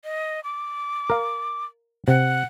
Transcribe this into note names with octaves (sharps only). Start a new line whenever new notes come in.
D#5
D6
A#4 F5
C3 F#5